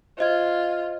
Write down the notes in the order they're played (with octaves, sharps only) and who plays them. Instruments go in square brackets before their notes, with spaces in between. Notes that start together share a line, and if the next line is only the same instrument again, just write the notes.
[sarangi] F4 [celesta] C5 D#5 G#6